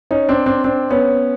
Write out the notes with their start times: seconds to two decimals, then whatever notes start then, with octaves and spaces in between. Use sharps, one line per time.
0.11 C#4 D#4
0.29 C4 D4
0.46 C4 D4
0.64 C4 D4
0.90 B3 C#4